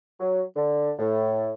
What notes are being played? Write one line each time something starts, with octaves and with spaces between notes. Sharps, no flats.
F#3
D3
A2